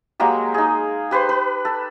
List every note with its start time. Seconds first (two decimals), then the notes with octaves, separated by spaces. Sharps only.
0.20 F#3 G#3 A#3 G4
0.54 D#4 G#4
1.11 G4 B4 C5 C6
1.29 B4
1.65 A4